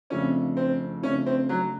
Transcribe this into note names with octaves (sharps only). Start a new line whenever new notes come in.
F2 C#3 F3 A3 C#4 D4
C4
F2 C#3 F3 A3 C#4 D4
C4
F#3